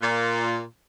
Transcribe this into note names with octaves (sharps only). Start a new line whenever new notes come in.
A#2